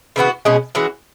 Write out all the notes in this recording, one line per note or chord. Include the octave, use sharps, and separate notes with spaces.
C#3 E3 B3 F#4
B2 G#3 C#4 G#4
E3 G#3 C#4 F#4